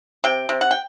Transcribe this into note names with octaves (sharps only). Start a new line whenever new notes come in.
C3 G5
C3
F#5
G5